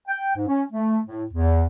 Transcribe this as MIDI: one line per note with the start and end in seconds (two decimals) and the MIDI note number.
0.08 0.35 79
0.36 0.47 44
0.48 0.63 61
0.72 0.98 57
1.06 1.24 45
1.32 1.64 40